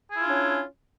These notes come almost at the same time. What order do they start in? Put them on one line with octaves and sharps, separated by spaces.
G#4 E4 F4 D4 C#4